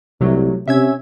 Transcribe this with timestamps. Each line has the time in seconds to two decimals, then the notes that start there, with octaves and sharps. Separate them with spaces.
0.21 C2 C3 F#3 A3
0.68 C3 C#4 E5 E6 G#6